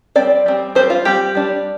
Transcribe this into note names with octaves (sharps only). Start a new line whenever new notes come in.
G3 C4 D5
G3 C4
G3 C4 C5
F4
G3 C4 G4
G3 D4